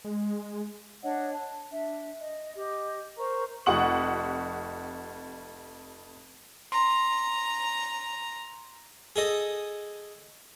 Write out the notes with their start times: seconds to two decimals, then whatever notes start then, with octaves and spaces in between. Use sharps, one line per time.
0.05 G#3
1.03 D4 C#5 D#5 F#5
1.33 A5
1.71 D4 E5
2.20 D#5
2.55 G4 D#5
3.18 A#4 C5 A#5 C#6
3.66 F1 F2 G4 F#5 C#6 F#7
6.72 A#5 C6
9.16 G#4 A4 D#5